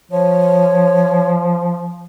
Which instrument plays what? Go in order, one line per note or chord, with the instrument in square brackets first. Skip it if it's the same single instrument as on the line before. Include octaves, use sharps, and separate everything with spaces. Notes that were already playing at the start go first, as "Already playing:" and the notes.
[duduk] F3 [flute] C#5